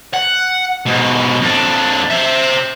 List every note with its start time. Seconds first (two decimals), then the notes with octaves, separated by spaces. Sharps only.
0.14 F#5
0.86 G#2 B2
1.41 F2 D4
2.11 C5 E5